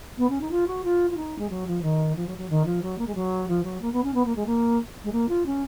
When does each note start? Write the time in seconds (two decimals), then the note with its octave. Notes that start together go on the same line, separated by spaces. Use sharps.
0.17 B3
0.29 C#4
0.40 D#4
0.51 F4
0.67 F#4
0.84 F4
1.10 F4
1.16 D#4
1.38 G#3
1.49 F#3
1.67 F3
1.82 D#3
2.15 F3
2.27 F#3
2.37 F#3
2.49 D#3
2.65 F3
2.82 F#3
2.98 A#3
3.06 G#3
3.14 F#3
3.48 F3
3.63 F#3
3.81 A#3
3.92 B3
4.03 C#4
4.14 B3
4.25 A#3
4.35 G#3
4.46 A#3
5.04 G#3
5.12 A#3
5.28 F4
5.45 C#4